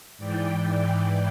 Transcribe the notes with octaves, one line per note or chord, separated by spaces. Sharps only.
G#2 E3 D5 G5